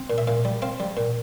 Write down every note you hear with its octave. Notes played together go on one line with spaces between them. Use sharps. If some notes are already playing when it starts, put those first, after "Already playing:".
Already playing: C4
A#2
E5
A#2 F5
G3
C4 F5
G3
A#2